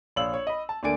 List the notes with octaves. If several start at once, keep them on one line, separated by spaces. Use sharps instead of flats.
A#1 C#5 F5 E6 F#7
C#5
D#5 B5
A5
D2 D3 A#3 D5 G#5 D7